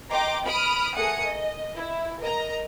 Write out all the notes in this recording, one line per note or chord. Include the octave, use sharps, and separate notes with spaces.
D#5 G5 A#5 C6 D6
B5 D#6 F6 D7
A3 G#4 A#4 F#5 D#6 C#7
D#5
E4
A#4 D#5 A#5